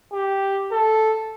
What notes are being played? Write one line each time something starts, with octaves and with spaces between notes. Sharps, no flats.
G4
A4